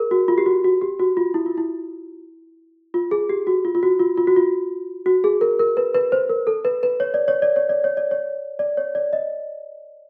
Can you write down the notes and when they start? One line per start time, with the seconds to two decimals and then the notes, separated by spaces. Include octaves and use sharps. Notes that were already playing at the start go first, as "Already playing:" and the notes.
Already playing: G#4 A#4
0.11 F#4
0.28 F4
0.38 G4
0.46 F#4
0.64 F#4
0.81 G4
0.99 F#4
1.17 F4
1.34 E4
1.46 F4
1.58 E4
2.94 F4
3.11 G#4
3.29 G4
3.47 F#4
3.65 F4
3.75 F4
3.83 F#4
4.00 F4
4.17 F4
4.27 F#4
4.36 F4
5.06 F#4
5.24 G#4
5.41 A#4
5.59 A#4
5.77 B4
5.95 B4
6.12 C5
6.29 A#4
6.47 A4
6.65 B4
6.83 B4
7.00 C#5
7.14 D5
7.28 C#5
7.42 D5
7.56 C#5
7.69 D5
7.84 C#5
7.97 D5
8.11 C#5
8.59 D5
8.77 C#5
8.95 D5
9.13 D#5